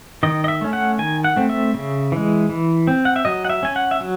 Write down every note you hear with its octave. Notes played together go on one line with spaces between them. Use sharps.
D#3 D#5
D#5
E5
A3 C#4
F#5
D#3 G#5
F#5
A3 C4
E5
C#3
E3 G#3
E3
C4
F#5
E5
F#3 D#5
F#5
E5
C#4 G#5
F#5
E5
F#3